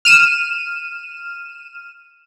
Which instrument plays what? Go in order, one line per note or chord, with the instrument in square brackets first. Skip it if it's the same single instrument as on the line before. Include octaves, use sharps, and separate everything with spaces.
[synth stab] F6 D#7 E7